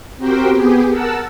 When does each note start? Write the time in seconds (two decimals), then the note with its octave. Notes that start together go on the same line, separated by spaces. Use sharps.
0.17 C4 F#4 G4 A#4 C5 G5
0.48 B3 G4 G#4
0.89 A#4 F#5 A5 E6